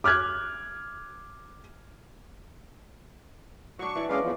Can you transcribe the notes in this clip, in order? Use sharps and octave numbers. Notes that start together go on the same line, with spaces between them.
D6 F6 F#6 G#6
F#3 D4 C#6
E3 D5
G#3 C#4 B4 D5 D#5 F5
E2 F3